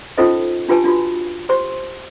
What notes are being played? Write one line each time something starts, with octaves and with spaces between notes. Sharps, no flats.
C#4 D#4 F4 A4 C5 D#5
D4 F4 G4 B4 G#5 A5
D4 F4 F#4 B5
G4 C5 C#5 C6 C#6